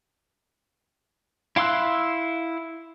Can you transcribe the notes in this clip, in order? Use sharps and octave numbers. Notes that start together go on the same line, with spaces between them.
E4 F5 C6 E6 F#6